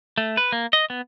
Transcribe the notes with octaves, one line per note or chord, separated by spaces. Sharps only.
A3
B4
A#3
D#5
B3